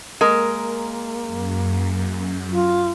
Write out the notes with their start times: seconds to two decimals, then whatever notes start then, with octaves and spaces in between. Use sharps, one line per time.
0.21 G#3 A#3 A#4
1.25 F#2
2.52 F4